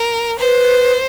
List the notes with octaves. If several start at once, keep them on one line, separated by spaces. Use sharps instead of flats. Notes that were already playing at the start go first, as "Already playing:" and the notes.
Already playing: A#4
B4 C5